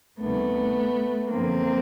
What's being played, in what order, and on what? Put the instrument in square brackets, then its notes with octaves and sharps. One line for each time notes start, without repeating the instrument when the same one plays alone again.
[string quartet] D2 C3 D#3 G3 A3 B3
F#2 D3 F3 A#3 C4